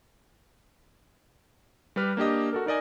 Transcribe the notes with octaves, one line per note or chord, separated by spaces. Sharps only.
G3 G4 B4 F6
A#3 D4 G4 D#5
F#4 A4 A#4
D#4 A#4 D5 D#5 G#5